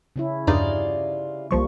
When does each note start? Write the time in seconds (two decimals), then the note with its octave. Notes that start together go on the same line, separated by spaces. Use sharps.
0.16 C#3 C#4 E4
0.47 E2 G2 C3 D#4 F4 D5
1.51 C2 F3 G3 A#3 C#6